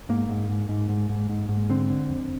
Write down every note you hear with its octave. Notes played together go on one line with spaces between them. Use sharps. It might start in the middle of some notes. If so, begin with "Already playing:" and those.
G#2 A#3
G#2
G#2
G#2
G#2
G#2
G#2
G#2
D3 C4
D3
F2